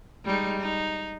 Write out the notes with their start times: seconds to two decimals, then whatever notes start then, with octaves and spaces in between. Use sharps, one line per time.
0.25 G3 G#3 D#4
0.60 D#4